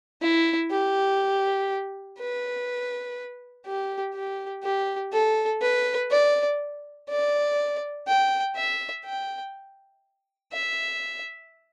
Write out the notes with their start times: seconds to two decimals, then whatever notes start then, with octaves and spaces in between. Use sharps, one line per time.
0.22 E4
0.71 G4
2.19 B4
3.66 G4
4.14 G4
4.64 G4
5.13 A4
5.62 B4
6.10 D5
7.09 D5
8.07 G5
8.56 E5
9.05 G5
10.53 E5